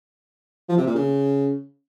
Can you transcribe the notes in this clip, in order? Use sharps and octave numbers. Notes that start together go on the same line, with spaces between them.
F3
C3
A#2
C#3